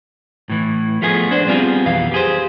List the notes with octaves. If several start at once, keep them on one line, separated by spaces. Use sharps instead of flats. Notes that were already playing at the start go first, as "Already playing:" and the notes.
A2 E3
F3 A3 B3 G#4
D4 C5
G3 B3 C4 F4 G#4
B1 F2 E3 B3 F5
G4 G#4 C5